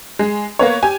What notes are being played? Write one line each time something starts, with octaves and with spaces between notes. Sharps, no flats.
G#3
A#3 B3 C#5
G4 G#5